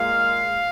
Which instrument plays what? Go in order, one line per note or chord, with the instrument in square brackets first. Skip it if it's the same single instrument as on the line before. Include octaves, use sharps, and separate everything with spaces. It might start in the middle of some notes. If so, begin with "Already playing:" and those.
Already playing: [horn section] A#2 G#3 F5